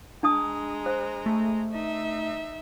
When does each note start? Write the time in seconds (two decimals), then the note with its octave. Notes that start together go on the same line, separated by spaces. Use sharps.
0.23 G#3 D4 A5 A#5 D#6
0.86 C5
1.26 A3
1.72 D#4 E5